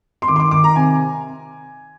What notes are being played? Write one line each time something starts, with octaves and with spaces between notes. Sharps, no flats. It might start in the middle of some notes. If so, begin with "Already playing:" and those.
C6
D#3 D6
C6
D6
D#3 D6
A#5
C3 G#5